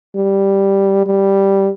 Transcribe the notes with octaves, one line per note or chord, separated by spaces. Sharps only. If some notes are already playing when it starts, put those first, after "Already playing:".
G3
G3